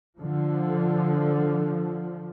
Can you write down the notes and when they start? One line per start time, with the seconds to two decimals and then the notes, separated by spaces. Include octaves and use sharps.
0.19 D3 F3